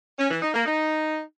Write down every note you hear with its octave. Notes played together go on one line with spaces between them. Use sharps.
C#4
E3
D#4
A#3
D#4